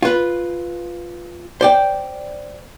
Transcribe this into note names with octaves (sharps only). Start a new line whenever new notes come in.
F4 B4
C5 D5 G5